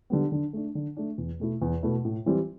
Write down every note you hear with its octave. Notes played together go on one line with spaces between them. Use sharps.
D3 G3 B3
D3
A3 D4
D3
A3 D4
E2
B2 A3 E4
E2
B2 A3 E4
A2
E3 G3 C4